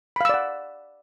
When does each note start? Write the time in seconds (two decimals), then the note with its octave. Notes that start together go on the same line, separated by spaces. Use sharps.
0.16 B5
0.21 F5
0.25 E6
0.29 D5
0.34 F#5